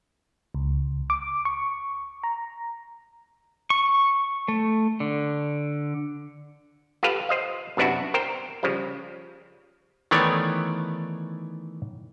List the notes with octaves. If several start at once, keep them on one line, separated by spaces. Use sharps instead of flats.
C#2
D6
C#6
A#5
C#6
A3
D3
F4 G4 A4 B4 F5
C5 D#5 F5
F#2 C3 B3 D4 E4 F#4
A#4 C5 G5
C#3 F3 G3
D#3 E3 A3 B3 C#5 D5